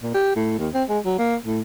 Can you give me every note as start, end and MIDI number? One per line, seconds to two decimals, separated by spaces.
0.03 0.14 46
0.14 0.32 67
0.36 0.53 45
0.58 0.69 39
0.74 0.84 60
0.89 0.99 56
1.06 1.14 54
1.18 1.35 58
1.46 1.61 45